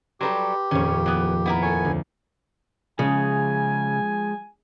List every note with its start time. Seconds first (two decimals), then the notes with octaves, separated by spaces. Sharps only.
0.21 F#3 G3 G4 A4 B4 A#5 C6
0.71 D#1 F2 D#3 C#4 C#5
1.06 E3 B3
1.46 B3 E4 A#4
1.62 A4 C#5 G#5
1.85 D2
2.99 C#3 F3 G#3 G#5